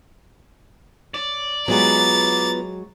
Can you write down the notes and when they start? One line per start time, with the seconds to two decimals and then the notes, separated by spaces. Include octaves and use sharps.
1.14 C#5 D5
1.68 F#3 G#3 B3 F4 G4 B4 A#5 A6